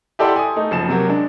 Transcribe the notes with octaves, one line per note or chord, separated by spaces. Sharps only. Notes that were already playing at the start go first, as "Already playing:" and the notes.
E4 G4 A4 D5 F#5 C6
G#5 D#6
A3 D#4
F#1 F3 E7
C3 F#3 A#3
G#3 D4